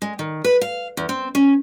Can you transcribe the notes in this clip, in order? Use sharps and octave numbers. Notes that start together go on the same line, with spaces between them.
G#3
D#3
B4
F5
E2
C4
C#4